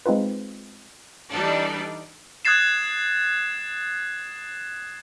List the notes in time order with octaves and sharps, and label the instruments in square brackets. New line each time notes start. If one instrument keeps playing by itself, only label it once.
[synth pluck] G#3 C4 D#4 F4 B4
[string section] E3 G3 D4 D#4 A4 D5
[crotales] D#6 F#6 G#6 A6 C7 E7